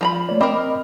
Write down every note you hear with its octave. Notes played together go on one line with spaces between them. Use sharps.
F3 A#5 B5
A3 C#5 D5
C4 A#4 D#5 B5 D6